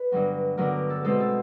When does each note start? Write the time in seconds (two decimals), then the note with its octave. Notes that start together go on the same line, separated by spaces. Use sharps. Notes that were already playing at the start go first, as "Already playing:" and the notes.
Already playing: B4
0.11 G2 D3 F#3 B3
0.57 G2 D3 F#3 B3 A#4
0.90 A4
1.04 B2 G#3 C4 A4
1.20 A4